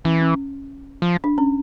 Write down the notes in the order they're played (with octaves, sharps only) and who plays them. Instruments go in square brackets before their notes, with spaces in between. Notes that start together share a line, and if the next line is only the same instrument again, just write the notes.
[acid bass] E3 [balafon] C#4
[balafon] C#4
[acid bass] F3
[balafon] D4
C#4